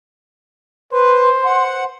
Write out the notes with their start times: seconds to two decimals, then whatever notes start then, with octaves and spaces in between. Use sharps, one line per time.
0.93 B4 C5 C6
1.45 F#5